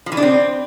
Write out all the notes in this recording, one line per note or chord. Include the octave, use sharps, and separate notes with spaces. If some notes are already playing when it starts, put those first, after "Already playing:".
F3
E3
D4
C4